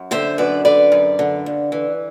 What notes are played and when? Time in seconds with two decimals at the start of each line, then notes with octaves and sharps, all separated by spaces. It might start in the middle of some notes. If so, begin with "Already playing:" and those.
Already playing: F#2
0.11 D3 C5 E5
0.38 F#2 B4 D5
0.65 D3 B4 D5
0.92 F#2
1.19 D3
1.46 G2
1.72 E3